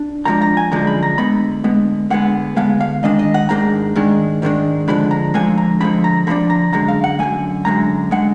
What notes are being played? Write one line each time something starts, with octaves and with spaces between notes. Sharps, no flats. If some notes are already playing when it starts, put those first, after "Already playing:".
Already playing: D4
F#2 D3 F3 G#3 D4 A#5
A#5
G#5
F#2 D3 F3 G#3 D4 A#5
B5
A#5
D3 G#3 B3 B5
D3 G#3 B3
D3 G#3 B3 F#5
D3 G#3 B3 F5
F5
G#2 D#3 G#3 D4 D#5
D#5
F#5
G#2 D#3 G#3 D4 A#5
G#2 D#3 G#3 D4
G#2 D#3 G#3 D4
D3 F3 G#3 D4 B5
A#5
D3 F3 G#3 D4 G#5
A#5
D3 F3 G#3 D4 B5
A#5
D3 F3 G#3 D4 B5
A#5
F#2 D3 G#3 A#5
F5
F#5
F#2 D3 G#3 G#5
F#2 D3 G#3 A#5
D3 G#3 F#5